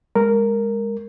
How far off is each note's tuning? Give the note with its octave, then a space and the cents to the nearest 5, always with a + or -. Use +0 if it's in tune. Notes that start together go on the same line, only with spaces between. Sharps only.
G#3 -20 A#4 -5